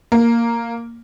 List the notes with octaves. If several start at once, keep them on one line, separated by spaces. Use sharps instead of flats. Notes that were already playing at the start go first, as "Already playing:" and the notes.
A#3